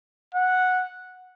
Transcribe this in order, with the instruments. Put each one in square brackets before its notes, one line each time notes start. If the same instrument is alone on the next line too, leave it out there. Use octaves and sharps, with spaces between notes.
[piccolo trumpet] F#5